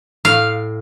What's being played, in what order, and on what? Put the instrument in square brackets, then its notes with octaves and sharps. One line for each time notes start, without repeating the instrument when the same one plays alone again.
[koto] A2 F5